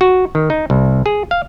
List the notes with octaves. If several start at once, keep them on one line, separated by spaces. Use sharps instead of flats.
F#4
D#3
D#4
C2
G#4
F5